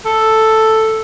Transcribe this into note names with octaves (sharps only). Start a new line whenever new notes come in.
A4